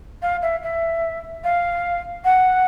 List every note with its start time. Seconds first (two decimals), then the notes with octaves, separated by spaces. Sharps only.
0.22 F5
0.42 E5
0.63 E5
1.44 F5
2.25 F#5